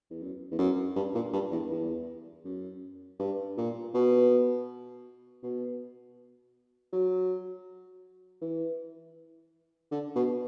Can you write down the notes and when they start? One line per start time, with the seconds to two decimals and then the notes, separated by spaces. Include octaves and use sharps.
0.11 E2
0.21 F#2
0.51 E2
0.59 F#2
0.96 G2
1.15 A#2
1.33 G2
1.52 E2
1.70 E2
2.45 F#2
3.20 G2
3.57 A#2
3.94 B2
5.43 B2
6.93 F#3
8.42 E3
9.91 D3
10.16 B2